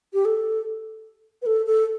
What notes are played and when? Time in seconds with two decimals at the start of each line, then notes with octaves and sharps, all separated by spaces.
0.13 G4
0.25 A4
1.42 B4
1.46 A4
1.66 A4